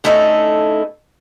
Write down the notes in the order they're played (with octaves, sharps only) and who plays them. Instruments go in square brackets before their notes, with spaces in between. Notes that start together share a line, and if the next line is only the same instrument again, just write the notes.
[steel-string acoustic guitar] D3 A3 C#4 D#4 E4 A4